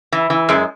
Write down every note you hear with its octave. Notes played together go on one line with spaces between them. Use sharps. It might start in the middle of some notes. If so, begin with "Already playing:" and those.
E3
E3
F#2 G#3